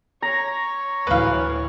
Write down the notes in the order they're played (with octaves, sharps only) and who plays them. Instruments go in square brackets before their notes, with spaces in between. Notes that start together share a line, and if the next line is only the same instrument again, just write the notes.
[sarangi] C#5 [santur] A#5
[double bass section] D2 A2 E3 [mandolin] B4 F5